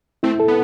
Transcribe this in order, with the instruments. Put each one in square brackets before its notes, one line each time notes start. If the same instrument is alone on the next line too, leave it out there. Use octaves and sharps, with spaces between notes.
[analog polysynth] A3 C4 [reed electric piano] E4
[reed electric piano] A4
[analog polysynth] B3